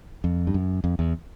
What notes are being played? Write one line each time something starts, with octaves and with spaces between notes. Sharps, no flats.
F2
G2
F#2
F2
E2